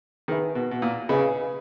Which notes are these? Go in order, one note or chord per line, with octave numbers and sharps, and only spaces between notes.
D#3 G#4 B4 E5
B2
B2
A#2
C#3 G#4 B4 D#5 G#5 B5